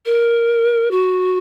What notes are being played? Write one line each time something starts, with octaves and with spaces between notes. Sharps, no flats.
A#4
F#4